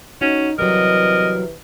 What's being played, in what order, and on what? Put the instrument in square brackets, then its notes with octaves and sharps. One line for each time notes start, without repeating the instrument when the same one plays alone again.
[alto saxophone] C#4 [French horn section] D#4 [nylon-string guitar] F#4
[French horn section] C3 E3 B4 [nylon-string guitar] F#3 G3 [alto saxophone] A#4 [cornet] D#5